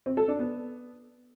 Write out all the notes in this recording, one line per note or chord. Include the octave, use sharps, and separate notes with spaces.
C4
A4
D4
B3